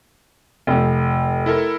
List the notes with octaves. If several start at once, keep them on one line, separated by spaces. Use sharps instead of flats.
F1
E4 A4 A#4